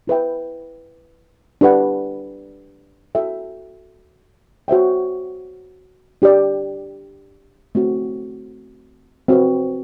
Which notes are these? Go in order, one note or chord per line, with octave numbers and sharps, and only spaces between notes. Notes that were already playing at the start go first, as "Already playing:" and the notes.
E4 B4 E5 G5
D4 G4 B4 F#5
F#4 A4 E5 G5
F#4 C5 E5 G5
D4 G4 D5
A3 C4 F#4
C4 F#4 B4